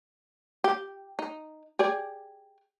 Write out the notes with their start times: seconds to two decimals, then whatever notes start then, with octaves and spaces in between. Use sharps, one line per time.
0.64 G4
1.19 D#4
1.79 G4 G#4 D5